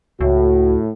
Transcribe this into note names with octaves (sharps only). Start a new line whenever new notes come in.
C#2 A2 F#4